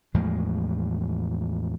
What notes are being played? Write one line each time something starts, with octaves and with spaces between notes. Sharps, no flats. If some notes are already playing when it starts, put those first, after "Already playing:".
E2 A2 F3 G#3